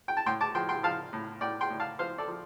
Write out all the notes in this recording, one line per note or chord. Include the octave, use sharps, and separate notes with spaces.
G5
A5
A2 G5 C6
A5 D6
F3 G5 C6
G5 C6
F3 F5 A5
A2
A2 D5 G5
G5 C6
A2
F5 A5
F3 C5 F5
A4 D5
F3